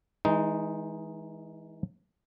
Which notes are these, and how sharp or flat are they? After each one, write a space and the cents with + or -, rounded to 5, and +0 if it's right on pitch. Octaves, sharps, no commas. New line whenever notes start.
E3 -30 G#3 +0 D#4 +0